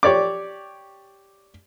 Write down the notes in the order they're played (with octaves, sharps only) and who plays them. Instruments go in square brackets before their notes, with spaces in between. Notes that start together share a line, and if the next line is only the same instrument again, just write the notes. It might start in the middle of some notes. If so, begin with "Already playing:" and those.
[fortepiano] G4 C#5 D5 D6